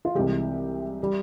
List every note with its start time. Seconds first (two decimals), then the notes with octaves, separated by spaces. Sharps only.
0.05 F4
0.15 C2 C3 E3 G#3 G4
1.03 G3